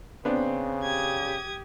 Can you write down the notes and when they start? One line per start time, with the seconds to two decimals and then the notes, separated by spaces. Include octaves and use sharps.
0.25 C#3 B3 C4 D4
0.83 G4 D#6 G#6